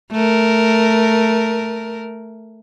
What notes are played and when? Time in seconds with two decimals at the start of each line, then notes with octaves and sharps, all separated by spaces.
0.12 A3 A#4